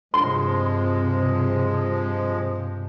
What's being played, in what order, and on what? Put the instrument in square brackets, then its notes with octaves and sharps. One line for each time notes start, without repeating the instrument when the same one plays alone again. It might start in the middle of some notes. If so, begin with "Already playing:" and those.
[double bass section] G2 C3 [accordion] F3 G#3 [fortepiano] C6